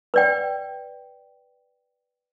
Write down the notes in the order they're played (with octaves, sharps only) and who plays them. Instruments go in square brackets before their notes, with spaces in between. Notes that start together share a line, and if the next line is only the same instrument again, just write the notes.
[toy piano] B4 D5 G5